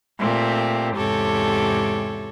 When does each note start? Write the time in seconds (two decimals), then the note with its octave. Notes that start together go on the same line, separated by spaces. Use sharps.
0.19 A#2 A3 C4 G4
0.95 E2 G#2 C3 G4 A4 C#5